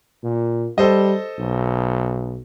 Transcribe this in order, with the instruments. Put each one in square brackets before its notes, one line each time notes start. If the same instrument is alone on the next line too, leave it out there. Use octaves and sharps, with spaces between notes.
[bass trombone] A#2
[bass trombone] G3 [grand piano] A4 C5 D#5
[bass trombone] B1